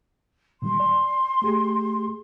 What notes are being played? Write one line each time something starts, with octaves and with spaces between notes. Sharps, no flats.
A#2 D#3 G3 C6
D5
A3 G4 G#4